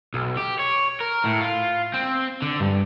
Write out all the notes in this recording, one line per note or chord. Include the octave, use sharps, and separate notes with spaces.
B1
G4
C#5
A#4
A2
F4
C4
D3
G2